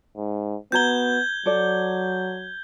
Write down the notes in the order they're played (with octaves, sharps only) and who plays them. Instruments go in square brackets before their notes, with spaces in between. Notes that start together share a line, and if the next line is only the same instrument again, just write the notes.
[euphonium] G#2
[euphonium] B3 [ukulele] F#4 A#5 [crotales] G6 G#6 G7
[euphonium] F#3 [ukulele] A4 D5